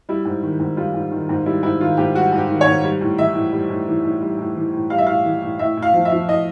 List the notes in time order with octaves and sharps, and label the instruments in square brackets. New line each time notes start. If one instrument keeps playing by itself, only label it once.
[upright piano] G3 E4
G#2
D#3
G#2
G3 F4
G#2
D#3
G#2
G3 E4
G#2 E4
D#3 F4
G#2 G4
G3 F#4
G#2
G4
D#3
C#5
G#2
G3
A2
E3 E5
A2
G3
A2
E3
A2
G3
A2
E3
A2
G3 F5
E5
A2 F5
E3
A2
A2 E5
A2
F5
F3
E5
F3
A2 D#5